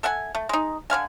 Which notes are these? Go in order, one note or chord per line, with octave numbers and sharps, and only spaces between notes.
A4 E5 F#5 G#5
A3
G#3 D#4
D3 C#5 F5 G#5